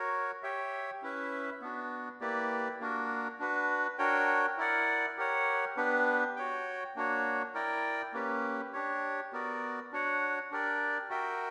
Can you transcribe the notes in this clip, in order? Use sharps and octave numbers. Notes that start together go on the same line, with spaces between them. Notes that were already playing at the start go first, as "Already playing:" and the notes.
Already playing: F#4 A#4 C#5
G4 C#5 E5 G5
C#4 E4 B4 E5
B3 D4 F#4
A#3 E4 G4 B4 D5
A#3 D4 F#4 A#4
D4 F#4 B4
D4 F#4 A#4 C#5 G5
E4 A#4 D5 F#5
G4 A#4 C#5 F#5
B3 D4 G4 B4
F#4 C#5 G5
A#3 D4 F#4 C#5
E4 A#4 D5 G5
A#3 C#4 G4 B4
D4 G4 C#5
B3 F#4 A#4 D5
D4 F#4 C#5 F#5
D4 G4 A#4 D5
F#4 A#4 E5 G5